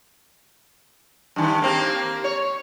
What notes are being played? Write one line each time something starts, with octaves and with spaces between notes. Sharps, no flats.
G2 D#3
A#3 C4 G4
C#5